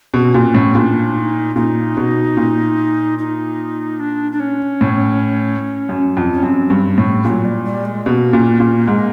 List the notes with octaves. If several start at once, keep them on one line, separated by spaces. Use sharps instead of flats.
B2
C4
C#4
A#2 C4
C#4
A2
A#2 D4
D#4
A#2 D#4
B2
A#2
D#4
D4
D4
C#4
A2
F#2
F2
C#4
F#2 C4
G2
A2
A#2 F#3
G3
G3
G#3
B2 A#3
A#2
A#2
G#2